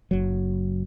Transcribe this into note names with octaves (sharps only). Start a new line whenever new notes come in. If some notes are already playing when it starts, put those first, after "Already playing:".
F#1 F#3